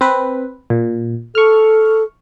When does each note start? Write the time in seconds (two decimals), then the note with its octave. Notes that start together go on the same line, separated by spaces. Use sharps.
0.01 C4 B4
0.70 A#2
1.35 A4 C#6 F6